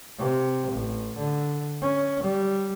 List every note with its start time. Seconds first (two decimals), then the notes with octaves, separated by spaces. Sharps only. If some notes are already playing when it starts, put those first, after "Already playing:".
0.19 C3
0.72 A1
1.17 D3
1.82 C#4
2.24 G3